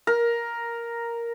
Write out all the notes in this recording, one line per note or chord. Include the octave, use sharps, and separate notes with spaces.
A#4